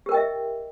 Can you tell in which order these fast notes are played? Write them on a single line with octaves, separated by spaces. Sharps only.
G4 A#4 G5 D#5 E5